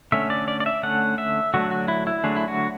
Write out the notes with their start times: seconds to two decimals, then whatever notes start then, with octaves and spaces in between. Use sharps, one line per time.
0.12 D3 A3 C#4 E5
0.30 D5
0.48 D5
0.60 D5
0.66 E5
0.83 D3 A3 C#4 F#5
1.18 E5
1.54 D3 F#3 A3 D4 F#4
1.71 F#4
1.88 E4
2.07 E4
2.24 D3 F#3 A3 D4 G#4
2.36 E4
2.48 F#4